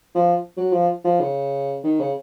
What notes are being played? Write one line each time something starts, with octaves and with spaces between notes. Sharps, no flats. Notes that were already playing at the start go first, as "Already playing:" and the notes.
F3
F#3
F3
F3
C#3
D#3
C#3